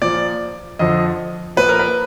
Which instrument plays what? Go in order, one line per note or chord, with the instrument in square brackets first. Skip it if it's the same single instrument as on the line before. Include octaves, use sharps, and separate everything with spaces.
[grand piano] A#2 F3 D5
F2 D3 F3 D#5
A#2 F3 B4
A#4
B4